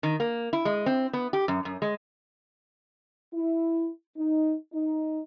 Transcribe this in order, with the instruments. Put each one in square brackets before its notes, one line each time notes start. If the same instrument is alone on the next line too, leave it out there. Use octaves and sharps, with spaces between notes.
[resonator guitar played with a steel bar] D#3
A#3
E4
G#3
C4
B3
G4
F#2
F#2
G#3
[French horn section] E4
D#4
D#4